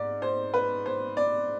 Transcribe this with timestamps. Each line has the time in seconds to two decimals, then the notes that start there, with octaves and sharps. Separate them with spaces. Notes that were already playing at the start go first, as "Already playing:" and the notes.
Already playing: G#2 D5
0.22 C5
0.54 B4
0.86 C5
1.17 D5